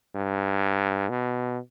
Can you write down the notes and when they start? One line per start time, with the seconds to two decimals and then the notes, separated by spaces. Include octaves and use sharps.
0.15 G2
1.10 B2